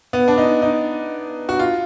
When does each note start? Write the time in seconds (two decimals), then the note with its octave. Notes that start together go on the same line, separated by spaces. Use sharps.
0.13 B3
0.28 D4
0.38 D#4
0.62 D#4
1.49 F#4
1.59 F4